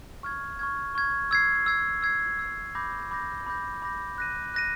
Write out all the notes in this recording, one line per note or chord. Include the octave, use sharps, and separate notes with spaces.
C#6 F6 G#6
C#6 F6 G#6
C#6 F6 G#6
E6 G#6 C7
E6 G#6 C7
E6 G#6 C7
E6 G#6 C7
B5 D6 G6 A#6
B5 D6 G6 A#6
B5 D6 G6 A#6
B5 D6 G6 A#6
F#6 A#6 D#7
F#6 A#6 D#7